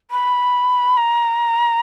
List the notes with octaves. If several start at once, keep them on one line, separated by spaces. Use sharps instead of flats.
B5
A#5